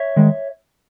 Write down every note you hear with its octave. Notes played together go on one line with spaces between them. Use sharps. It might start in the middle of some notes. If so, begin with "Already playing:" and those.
Already playing: C#5 E5
D#3 G#3